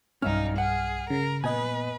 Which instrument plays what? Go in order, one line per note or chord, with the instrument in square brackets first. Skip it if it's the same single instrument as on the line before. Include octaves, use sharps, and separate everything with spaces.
[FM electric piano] B1 F6 [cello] G2 D#4 [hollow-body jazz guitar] C#4 E5 F5
[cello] G#4 [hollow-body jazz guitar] F#5
[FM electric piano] C#3 [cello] A#4
[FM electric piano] A#2 B3 D#5 [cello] B4 [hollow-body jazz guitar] G#5